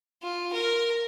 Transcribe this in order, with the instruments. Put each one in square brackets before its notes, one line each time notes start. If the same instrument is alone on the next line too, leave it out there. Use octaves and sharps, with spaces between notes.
[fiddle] F4
A#4